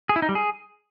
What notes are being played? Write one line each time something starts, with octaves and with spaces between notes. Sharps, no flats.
G#4
E4
D#4
G3
G#4